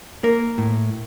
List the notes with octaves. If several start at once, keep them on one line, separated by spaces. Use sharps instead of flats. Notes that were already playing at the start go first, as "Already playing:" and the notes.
A#3 A#4
A2